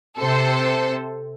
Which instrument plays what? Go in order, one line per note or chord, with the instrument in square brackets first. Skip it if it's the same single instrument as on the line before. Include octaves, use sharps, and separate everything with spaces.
[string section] C3 A4 C5